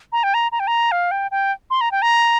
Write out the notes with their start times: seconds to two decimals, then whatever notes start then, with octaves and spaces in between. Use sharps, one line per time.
0.12 A#5
0.24 G5
0.34 A#5
0.52 A#5
0.60 G5
0.67 A#5
0.92 F5
1.11 G5
1.31 G5
1.70 C6
1.81 A#5
1.92 G5
2.02 A#5